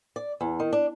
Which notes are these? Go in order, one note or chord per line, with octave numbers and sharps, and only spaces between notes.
D5
E2
D#3
D4